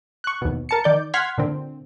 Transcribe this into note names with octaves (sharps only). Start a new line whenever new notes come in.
C#6 F#6
D#2 B2
A#4 A5 C#7
D#3 D5 G6
F#5 C6 F6 G#6 B6
A#2 D3 C4